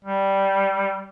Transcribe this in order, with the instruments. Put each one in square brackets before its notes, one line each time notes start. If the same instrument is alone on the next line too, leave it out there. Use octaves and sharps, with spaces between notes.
[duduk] G3